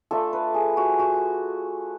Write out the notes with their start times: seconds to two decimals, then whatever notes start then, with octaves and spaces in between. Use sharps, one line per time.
0.11 A3 D4 F4 A4
0.33 B4
0.54 G#4
0.77 F#4
0.99 F#4